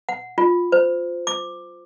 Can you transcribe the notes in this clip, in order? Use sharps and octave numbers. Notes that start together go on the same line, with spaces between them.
F#5
F4
C5
D6